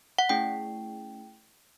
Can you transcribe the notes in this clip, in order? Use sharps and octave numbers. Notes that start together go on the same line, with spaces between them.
F#5
A3 C#4 E4 G#4 G5